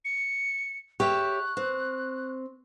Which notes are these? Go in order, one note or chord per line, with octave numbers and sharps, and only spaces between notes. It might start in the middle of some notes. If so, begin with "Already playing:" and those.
C#7
G4 C#5 E5 C#6 F#6
C4